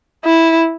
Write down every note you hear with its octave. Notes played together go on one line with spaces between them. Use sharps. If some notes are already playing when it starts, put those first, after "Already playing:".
E4